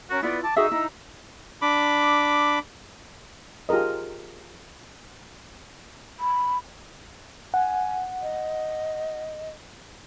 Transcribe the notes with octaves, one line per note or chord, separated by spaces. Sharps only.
C#4 F#4 A#4
B3 E4 F4 B4 D5
A5 D6
D#4 F#4 G#4 E5 D#6 E6
D#4 E4 A#5
D4 B5 D6
F4 G4 G#4 A#4 D#5
B5
F#5 G#5
D#5